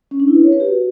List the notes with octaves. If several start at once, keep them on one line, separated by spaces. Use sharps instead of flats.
C#4
D4
E4
B4
C#5
B4
G4
F#4